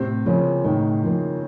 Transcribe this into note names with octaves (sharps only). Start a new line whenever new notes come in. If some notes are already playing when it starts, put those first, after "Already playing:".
Already playing: A2 C3 C4
C#3 F3 A#3 C#4
A2 D#3 D#4
F3 A#3